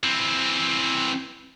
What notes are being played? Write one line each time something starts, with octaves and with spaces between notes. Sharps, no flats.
E3 C4